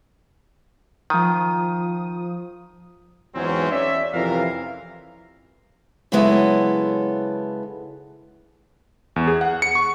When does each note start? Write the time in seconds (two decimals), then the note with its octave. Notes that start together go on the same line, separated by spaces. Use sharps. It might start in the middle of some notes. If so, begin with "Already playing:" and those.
1.10 D#3 F3 D#6
3.35 E2 G#2 E3 F#3 C4 C#4
3.71 C#4 C#5 D5 E5
4.14 F2 C3 E3 F4 A#4 F5
6.12 C#3 F#3 G#3 B3 E4 A4
9.16 E2
9.28 G#4
9.41 F#5
9.62 C#7
9.75 C#6